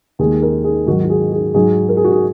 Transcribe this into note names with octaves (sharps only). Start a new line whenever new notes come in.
D#2 D#3 G#3 G#4
A#4
G#4
G#2 D#3 F#3 F#4
F#4
G#4
G#4
G#2 F#3 G#4
A#4
G#4
F#4
G#4